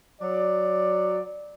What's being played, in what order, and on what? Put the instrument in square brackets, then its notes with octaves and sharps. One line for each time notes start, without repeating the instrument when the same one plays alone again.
[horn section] F#3 D5